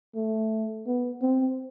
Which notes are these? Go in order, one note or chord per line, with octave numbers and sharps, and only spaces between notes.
A3
B3
C4